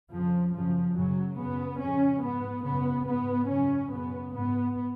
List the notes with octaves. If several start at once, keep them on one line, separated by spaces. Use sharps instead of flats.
F2 C#3 F3
F#2 C#3 F3
F#2 C#3 F#3
F#2 C#3 B3
F2 C#3 C#4
G#2 B3
F#2 C#3 B3
G#2 B3
F#2 C#3 C#4
F#2 C#3 B3
G#2 B3